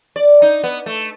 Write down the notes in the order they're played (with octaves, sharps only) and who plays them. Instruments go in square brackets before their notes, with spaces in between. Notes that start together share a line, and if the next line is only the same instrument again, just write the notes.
[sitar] D5
D#4
B3
A3